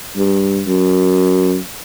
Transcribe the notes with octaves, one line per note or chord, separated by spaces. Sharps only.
G2
F#2